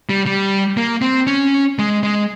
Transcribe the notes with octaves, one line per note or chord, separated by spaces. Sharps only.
G3
G3
A#3
C4
C#4
G#3
G#3